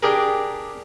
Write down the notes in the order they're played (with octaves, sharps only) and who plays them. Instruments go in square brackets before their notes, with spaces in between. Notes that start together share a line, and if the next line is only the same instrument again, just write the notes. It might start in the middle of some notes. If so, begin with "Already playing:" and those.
[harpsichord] D4 G4 G#4 A#4